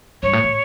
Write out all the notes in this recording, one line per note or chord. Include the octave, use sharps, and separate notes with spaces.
G2 C#5
A2
A2